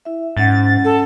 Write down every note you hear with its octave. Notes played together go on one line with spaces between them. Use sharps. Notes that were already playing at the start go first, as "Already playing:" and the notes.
E4 E5
G#2 C#4 F#5 A6
A4